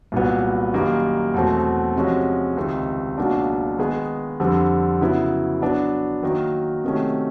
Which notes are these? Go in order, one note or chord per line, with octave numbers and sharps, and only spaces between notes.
C2 A#2 F#3 B3
F#2 D#3 G3 A#3
E2 B2 F#3 A3 C4
C3 F3 G#3 C#4 F#4
C#2 C3 D#3
C#2 B2 F#3 A#3 D4
D#3 G#3 B3 D#4 G#4
F2 D3 G3 C4
C#3 F#3 B3 E4
F#3 B3 D4
D#3 F#3 A#3
C3 D#3 F#3 A3 C#4